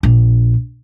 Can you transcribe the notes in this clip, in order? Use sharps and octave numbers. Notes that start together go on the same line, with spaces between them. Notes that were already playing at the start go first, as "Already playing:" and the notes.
A#1